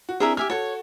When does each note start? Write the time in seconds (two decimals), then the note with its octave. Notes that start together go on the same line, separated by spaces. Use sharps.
0.09 F#4
0.20 C4 D4 E4 G#4 A#4 E5
0.37 G4 E5 G#5 F6
0.50 F#4 A4 C#5